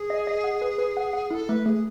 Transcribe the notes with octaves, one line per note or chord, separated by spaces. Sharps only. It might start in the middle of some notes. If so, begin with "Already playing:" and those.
Already playing: G#4
D#5
D#5
F#5
B4
B4
F#5
F#5
E4 A4
A3 B4
A3 G#4